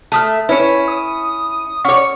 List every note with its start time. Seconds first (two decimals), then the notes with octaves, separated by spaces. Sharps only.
0.12 A3 E5 A5 D#6 F6
0.49 C#4 E4 B4 C#5
0.88 D#6
1.85 C#4 C#5 F#5 C#6 D6